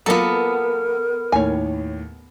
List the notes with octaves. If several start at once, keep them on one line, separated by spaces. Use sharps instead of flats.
F#3 A#3 B3 F4 A4 A#4
D#2 A2 D#3 C#5 G#5